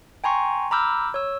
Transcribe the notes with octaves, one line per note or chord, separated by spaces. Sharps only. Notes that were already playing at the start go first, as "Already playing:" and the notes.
G5 G#5 A#5 C6 C#6
A#5 B5 D6 E6 F6 G6
C#5 E6